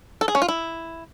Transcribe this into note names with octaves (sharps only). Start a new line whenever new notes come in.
A4
G#4
C#4
F4
E4